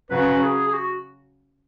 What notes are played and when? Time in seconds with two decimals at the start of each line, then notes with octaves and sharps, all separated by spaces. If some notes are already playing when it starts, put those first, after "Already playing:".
0.10 C#3 F#3 C#4 F#4 B4
0.43 G#4
0.67 G#4
0.74 F#4